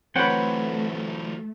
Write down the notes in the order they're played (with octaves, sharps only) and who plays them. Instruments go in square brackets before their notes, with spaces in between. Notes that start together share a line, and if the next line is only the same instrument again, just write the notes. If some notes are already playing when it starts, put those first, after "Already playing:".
[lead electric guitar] E3 F#3 [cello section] A3 [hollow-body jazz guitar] C4 B4 [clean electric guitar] C#5 F#5 G5